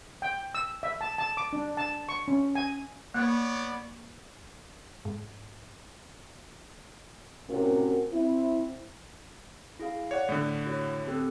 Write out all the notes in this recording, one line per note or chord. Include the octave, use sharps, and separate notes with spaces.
G5
E6
E5
A5
A5
D6
D4
A5
C#6
C#4
G#5
A#3 B3 C#5 D5
G#2
A2 C3 C#4 F#4 A#4
C4 E4
E4 G#4 F5
C#5 D5 F#5
A2 D3
E4 F#4 C#5
C4 G4 A4